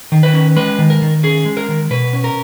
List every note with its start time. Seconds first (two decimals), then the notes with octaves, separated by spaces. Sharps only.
0.12 D#3
0.23 B4
0.34 C#4
0.56 G#3 B4
0.79 D#3
0.90 A#4
1.02 D#3
1.23 C#4 G#4
1.45 G#3
1.57 A#4
1.69 D#3
1.90 B2 B4
2.13 C#4
2.24 A#4